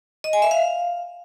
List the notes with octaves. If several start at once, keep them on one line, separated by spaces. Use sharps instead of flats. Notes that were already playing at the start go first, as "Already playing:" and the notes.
D#5
G#5
E5
F5